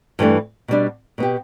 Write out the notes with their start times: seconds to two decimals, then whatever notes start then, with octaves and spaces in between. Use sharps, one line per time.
0.19 G2 E3 A3 D4
0.68 B2 G3 D4
1.18 B2 B3 G4